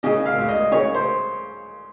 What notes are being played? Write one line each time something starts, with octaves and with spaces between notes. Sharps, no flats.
C#3 D#5
F5
C#2
D#5
C#3 C#5
C5